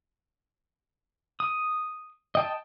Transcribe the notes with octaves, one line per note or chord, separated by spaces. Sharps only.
D#6
D#5 G5 A5